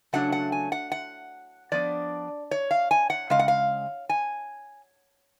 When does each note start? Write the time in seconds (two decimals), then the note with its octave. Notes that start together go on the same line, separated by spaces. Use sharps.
0.13 C#3 F#3 A3 D4 F#5
0.32 F#5
0.52 G#5
0.72 F#5
0.92 F#5
1.72 F3 B3 D4 D5
2.51 C#5
2.71 F5
2.91 G#5
3.10 F#5
3.30 C#3 G#3 F5
3.39 F#5
3.48 F5
4.09 G#5